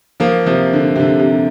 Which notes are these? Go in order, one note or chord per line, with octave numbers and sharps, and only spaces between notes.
F3 A#3
C3 F3
D3
C3
D3
C3